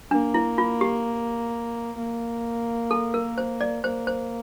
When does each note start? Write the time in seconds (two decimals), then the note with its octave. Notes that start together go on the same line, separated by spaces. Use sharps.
0.11 A#3 D4
0.34 E4
0.58 F4
0.81 G4
1.98 A#3
2.91 A4
3.14 A#4
3.38 C5
3.61 D5
3.84 A#3 C5
4.07 C5